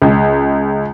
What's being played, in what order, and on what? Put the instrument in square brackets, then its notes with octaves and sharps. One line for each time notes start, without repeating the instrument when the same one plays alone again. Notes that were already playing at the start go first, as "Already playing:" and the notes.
[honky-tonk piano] C#2